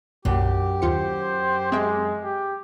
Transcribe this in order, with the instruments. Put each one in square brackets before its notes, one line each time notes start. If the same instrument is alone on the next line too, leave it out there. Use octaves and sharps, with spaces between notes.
[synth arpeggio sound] B1 A#2 [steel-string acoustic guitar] F#2 [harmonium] G4
[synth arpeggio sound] D#2 F4 C#7 [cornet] C5
[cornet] G#3 [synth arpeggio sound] C4 E5
[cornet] G4